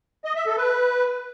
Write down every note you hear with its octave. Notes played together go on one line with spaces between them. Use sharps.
D#5
E5
A4
B4